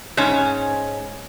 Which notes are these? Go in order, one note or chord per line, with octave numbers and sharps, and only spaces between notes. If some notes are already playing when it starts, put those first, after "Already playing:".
G#2 C#4